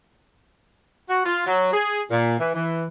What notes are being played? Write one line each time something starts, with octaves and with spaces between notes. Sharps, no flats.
F#4
F4
F#3
G#4
A#2
E3
E3